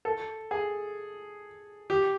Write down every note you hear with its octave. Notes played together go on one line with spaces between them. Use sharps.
A4
G#4
G4